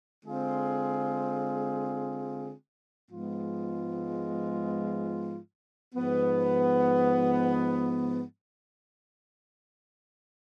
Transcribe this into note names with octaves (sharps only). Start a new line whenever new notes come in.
D3 G#3 C4 F4 G#4
G#2 F3 G#3 B3 F4
G#2 F3 B3